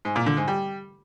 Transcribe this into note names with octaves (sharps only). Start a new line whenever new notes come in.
G#2
A#2
D3
G#2
G3